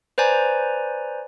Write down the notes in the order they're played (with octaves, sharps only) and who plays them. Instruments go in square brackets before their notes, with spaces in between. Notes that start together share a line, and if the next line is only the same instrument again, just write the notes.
[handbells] B4 C5 D5 G#5 A#5